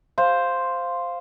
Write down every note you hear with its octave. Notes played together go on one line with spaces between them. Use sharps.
C5 F5